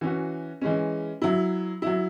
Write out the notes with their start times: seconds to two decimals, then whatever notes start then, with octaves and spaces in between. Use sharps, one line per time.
0.01 E3 C#4 F#4
0.61 E3 G#3 C#4
1.22 F#3 E4
1.82 F#3 E4